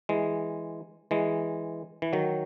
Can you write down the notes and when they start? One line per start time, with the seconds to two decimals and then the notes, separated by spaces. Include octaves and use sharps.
0.09 E3 G#3
1.11 E3 G#3
2.02 E3
2.13 D#3 F#3